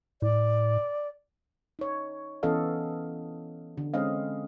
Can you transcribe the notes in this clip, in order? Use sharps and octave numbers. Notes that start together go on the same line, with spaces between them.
A2 D5
D#4 C#5
E3 B3 C#4 A4 D#5 F5
D3
G#3 C4 C#4 D#5 F5